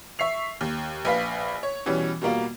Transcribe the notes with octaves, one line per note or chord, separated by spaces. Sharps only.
E5 C#6 C7 F7
D#2
A#1 B4 F5 B6
C#5
B2 E3 G3 C#4
B2 G3 A#3 F4